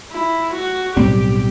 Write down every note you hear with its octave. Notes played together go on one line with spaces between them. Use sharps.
E4
F#4
B1 A2 G3 C4 G4